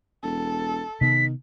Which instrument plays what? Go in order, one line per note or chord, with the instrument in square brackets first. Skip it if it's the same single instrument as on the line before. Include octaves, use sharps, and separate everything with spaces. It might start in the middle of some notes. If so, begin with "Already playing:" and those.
[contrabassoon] E1 [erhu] A4
[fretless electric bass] C3 B3 [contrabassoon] D#3 [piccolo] B6